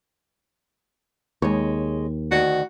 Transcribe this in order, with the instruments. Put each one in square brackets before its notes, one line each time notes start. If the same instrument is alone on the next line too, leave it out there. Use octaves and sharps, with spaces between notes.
[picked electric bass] D#2 [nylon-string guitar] G#3 C#5
[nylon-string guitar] D2 D#3 [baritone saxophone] F#4